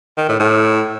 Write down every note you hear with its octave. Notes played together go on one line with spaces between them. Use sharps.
D#3
A2
A2